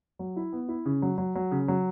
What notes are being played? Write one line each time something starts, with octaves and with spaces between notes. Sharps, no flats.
F#3
E4
B3
E4
C#3
F#3
F#3
F#3
C#3
F#3